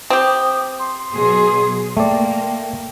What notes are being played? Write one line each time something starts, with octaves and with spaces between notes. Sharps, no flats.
C4 G4 D#6
C6
B2 F#3 G#4
A3 A#3 D5 G5